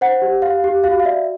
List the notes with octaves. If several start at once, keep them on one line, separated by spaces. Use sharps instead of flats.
C5 F#5
G4
G4 F5
G4
F#4 F5
F5
D5 E5